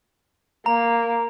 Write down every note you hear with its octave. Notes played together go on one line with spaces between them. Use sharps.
A#3 A#5